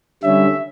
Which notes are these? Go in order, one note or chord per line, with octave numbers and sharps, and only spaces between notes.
D3 G3 C#4 E5